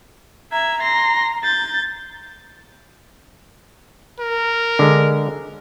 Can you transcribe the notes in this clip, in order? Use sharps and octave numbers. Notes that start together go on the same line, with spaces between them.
E5 A#5 G#6
C6 A#6
G6 A6
A#4
D3 G#3